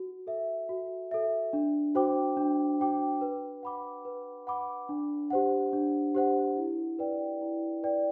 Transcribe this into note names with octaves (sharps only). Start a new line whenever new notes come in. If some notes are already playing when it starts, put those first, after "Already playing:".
Already playing: F#4
A4 E5
F#4
A4 E5
D4
F#4 C5 G5 D6
D4
F#4 C5 G5 D6
B4
F#5 B5 D6
B4
F#5 B5 D6
D4
G4 C5 F#5
D4
G4 C5 F#5
E4
B4 D5 G5
E4
B4 D5 G5